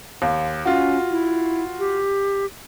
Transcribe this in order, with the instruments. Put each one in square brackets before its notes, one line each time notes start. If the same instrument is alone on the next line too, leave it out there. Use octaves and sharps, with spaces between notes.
[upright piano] D#2
[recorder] C#4 [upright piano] F4 F#4
[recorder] E4
G4